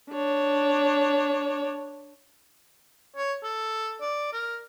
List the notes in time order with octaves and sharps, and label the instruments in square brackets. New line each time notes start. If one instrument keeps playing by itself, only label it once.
[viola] D4 C#5
[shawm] C#5
A4
D5
A#4